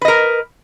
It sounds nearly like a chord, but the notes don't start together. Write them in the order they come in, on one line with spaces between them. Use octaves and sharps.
B4 D#5 A#4